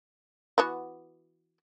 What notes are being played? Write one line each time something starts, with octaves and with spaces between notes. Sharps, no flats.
E3 B3 F#4